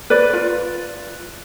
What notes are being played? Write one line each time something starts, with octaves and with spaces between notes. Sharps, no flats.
B4 D5
F4